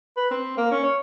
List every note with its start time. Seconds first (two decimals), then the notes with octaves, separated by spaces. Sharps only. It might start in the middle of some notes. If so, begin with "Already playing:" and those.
0.17 B4
0.31 C4
0.57 A#3
0.71 C#4
0.83 C#5